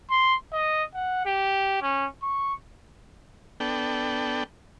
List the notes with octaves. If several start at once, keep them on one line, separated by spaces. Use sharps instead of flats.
C6
D#5
F#5
G4
C#4
C#6
B3 D4 A4 G5